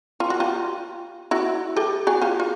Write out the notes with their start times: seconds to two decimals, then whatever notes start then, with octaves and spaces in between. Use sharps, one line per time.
0.20 F4
0.30 F#4
0.40 F4 G4
1.31 E4 F#4
1.76 G4 A4
2.07 F#4 G#4
2.22 F4 G4
2.40 F4